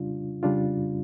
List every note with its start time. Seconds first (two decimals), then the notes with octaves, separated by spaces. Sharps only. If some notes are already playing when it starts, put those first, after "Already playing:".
Already playing: C#3 G3 D4 F4
0.43 C#3 G3 D4 F4